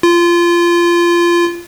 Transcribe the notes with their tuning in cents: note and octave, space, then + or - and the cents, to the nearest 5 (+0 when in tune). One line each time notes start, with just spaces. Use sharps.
F4 -20